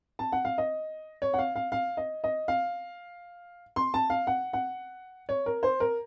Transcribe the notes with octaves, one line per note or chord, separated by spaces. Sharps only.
A5
F#5
F5
D#5
C#5
F#5
F5
F5
F5
D#5
D#5
F5
C6
A5
F5
F#5
F#5
C#5
A#4
C5
A#4